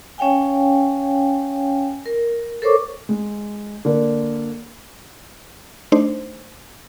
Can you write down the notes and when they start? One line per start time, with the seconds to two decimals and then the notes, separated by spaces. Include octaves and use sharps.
0.18 C#4 C#5 F5 G5 G#5
2.06 A#4
2.62 A4 A#4 C5 C#5 C#6 D6
3.09 G#3
3.85 D3 A#3 A#4
5.92 A3 D4 D#4 C5